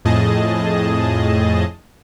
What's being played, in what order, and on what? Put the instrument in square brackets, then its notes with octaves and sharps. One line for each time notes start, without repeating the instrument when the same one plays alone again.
[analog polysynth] F2 A2 G#4 D#5 A5